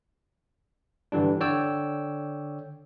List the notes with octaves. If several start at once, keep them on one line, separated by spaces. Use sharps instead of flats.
G2 D3 E3 G3 D4
D3 C#5 D5 G5 E6